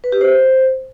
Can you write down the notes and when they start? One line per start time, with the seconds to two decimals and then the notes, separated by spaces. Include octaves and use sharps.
0.04 B4
0.12 G4
0.21 C5